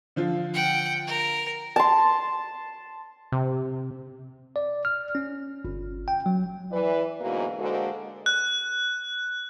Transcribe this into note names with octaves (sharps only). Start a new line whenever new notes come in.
D3 F3 F4
F#5 G5
A#4
A5 C6
C3
D5
F6
C#4
G1
G5
F#3
E3 B4 D5
G#2 B2 D3 E3 F#3 A#3
D3 G#3 A#3 F#4 A4 C5
F#6